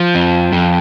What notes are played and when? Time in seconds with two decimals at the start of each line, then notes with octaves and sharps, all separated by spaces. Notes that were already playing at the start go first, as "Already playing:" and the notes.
Already playing: F3
0.15 F2
0.52 F2